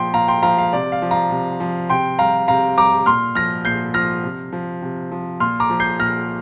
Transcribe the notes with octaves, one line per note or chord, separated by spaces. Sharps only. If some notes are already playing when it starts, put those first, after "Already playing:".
Already playing: A#2 F3 G5 C6
A#2 F5 A#5
G5 C6
F3 F5 A#5
F5
C3 D5
F5
F3
F5 A#5
C3
F3
C3 G5 C6
G3 F5 A#5
C3 F5 A#5
G3 A#5 D6
A#2 C6 F6
F3 F6 A#6
A#2 G6 C7
F3 F6 A#6
C3
F3
C3
F3
A#2 C6 F6
A#5 D6
F3
G6 C7
A#2 F6 A#6